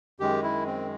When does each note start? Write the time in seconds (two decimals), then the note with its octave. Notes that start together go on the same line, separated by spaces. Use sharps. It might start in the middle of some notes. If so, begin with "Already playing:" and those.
0.20 F#2 D#3 G#3 G4
0.43 E4
0.66 C4